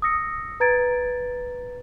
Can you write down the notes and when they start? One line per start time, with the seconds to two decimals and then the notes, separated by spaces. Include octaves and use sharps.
0.02 D#6 E6 A#6 C#7
0.60 B4 A#5 G#6 A6 D7